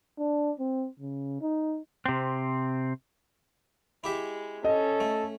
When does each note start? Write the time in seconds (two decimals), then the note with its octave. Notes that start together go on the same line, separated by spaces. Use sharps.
0.19 D4
0.59 C4
1.00 C#3
1.42 D#4
2.06 C3 C4
4.04 G#3 E4 G4 E5
4.64 C#4 A4 D#5
5.00 A3